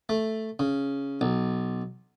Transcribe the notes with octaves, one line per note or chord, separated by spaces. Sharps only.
A3
C#3
B1